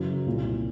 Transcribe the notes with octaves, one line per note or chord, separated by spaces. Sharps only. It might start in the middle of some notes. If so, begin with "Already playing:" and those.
Already playing: F#2 C#3 E3
C2 A#2